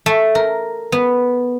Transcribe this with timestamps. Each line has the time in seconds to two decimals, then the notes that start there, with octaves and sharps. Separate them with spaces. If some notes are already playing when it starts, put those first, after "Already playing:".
0.06 A3
0.35 A#4
0.92 B3